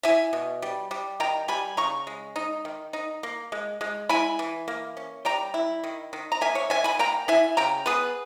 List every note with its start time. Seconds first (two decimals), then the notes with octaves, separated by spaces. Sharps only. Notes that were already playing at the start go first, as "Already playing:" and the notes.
0.03 E4 E5 G#5
0.33 B2
0.62 G3
0.91 G3
1.20 D#3 G5 A#5
1.48 G3 G#5 B5
1.77 C#3 A#5 C#6
2.07 G#3
2.36 D#4
2.65 D#3
2.93 D#4
3.23 A#3
3.52 G#3
3.81 G#3
4.09 E4 G#5 B5
4.39 E3
4.68 A#3
4.97 C#4
5.25 G3 G5 A#5
5.54 E4
5.84 D#3
6.13 D#3
6.32 A#5
6.41 A#3 E5 G#5
6.55 C#5 E5
6.70 D#3 E5 G#5
6.84 G#5 B5
6.99 A#3 G5 A#5
7.28 E4 E5 G#5
7.57 C#3 G5 A#5
7.86 B3 G#4 B4